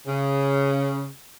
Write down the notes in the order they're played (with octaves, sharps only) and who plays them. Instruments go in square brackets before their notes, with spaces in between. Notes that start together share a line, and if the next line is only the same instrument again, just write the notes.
[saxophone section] C#3